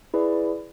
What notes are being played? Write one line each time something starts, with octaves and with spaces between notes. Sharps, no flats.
E4 G#4 B4 D5